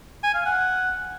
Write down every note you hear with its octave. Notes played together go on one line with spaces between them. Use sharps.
G#5
F5
F#5